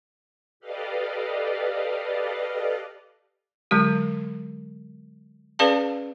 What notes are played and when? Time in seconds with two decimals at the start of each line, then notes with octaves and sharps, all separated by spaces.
0.60 G4 A4 B4 D5 D#5 F5
3.71 D3 F#3 G#3 G4
5.59 C#4 G#4 B4 D5 F5 A5